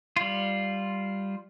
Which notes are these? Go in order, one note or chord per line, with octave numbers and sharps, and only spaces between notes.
G3 F4